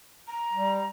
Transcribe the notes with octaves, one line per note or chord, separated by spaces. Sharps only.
A#5
G3